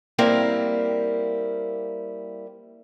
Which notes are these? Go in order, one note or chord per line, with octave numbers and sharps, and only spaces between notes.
G3 A#3 C4 E4 A#4 F5